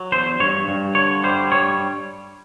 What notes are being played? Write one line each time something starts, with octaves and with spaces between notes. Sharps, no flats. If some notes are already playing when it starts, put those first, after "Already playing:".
Already playing: F#3
E2 C5
G2 C#5
G2
D3 C#5
G3 C5
G2 C#5